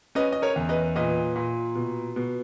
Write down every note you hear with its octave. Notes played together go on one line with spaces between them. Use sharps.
C#4 B4 D#5
D#5
A#4 C#5
E2
B4 D#5
A#2 B4 D#5
A#2
B2
B2